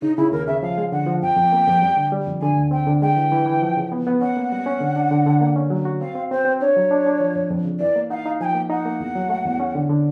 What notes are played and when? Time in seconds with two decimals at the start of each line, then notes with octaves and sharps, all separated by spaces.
0.02 C#3 D#4
0.17 C#3 E4
0.32 D#2 A#4
0.47 C#3 E5
0.62 F3 F5
0.78 G#3
0.92 D3 F#5
1.06 F3
1.22 F2 G5
1.37 F2
1.53 A#3
1.67 F2
1.82 G3
1.97 D3
2.12 G3
2.27 F2
2.42 D3 G#5
2.56 D2
2.71 C4 G5
2.87 D3
3.02 G#3 G5
3.17 E3
3.32 E3
3.46 E3
3.62 F3
3.77 C#3
3.92 B3
4.07 B3
4.21 C#4 F#5
4.37 A#3
4.52 G3
4.66 C#4
4.80 D3
4.96 D4
5.11 D3
5.26 D3
5.41 A#3
5.56 C#4
5.70 F#3
5.85 F#4
6.01 C4 F5
6.15 C4
6.31 C4 C5
6.45 C4
6.61 D4 C#5
6.76 F#3
6.91 D4
7.06 D4
7.20 F3
7.36 F2
7.50 F2
7.65 C#3
7.80 E3 D5
7.96 A#3
8.10 D#4 F5 F#5
8.26 D#4
8.40 F3 G#5
8.44 G5
8.55 A#3
8.70 D#4 F#5
8.85 A#3
9.00 E2
9.16 F#3
9.29 A3
9.45 E2
9.60 C#4
9.75 D3
9.89 D3